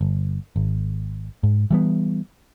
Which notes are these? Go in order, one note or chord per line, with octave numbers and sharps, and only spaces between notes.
G1
G#1
G#2
E3 G3 B3